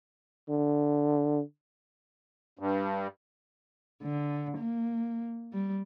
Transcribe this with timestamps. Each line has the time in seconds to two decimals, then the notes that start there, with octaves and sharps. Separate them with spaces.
0.49 D3
2.59 G2
4.03 D3
4.57 A#3
5.52 G3